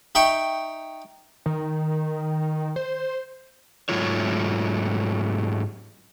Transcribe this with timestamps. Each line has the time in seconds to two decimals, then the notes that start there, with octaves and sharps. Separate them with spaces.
0.15 D#4 E5 G5 C#6
1.46 D#3
2.76 C5
3.89 G#2 F#3 A3 F4 C#5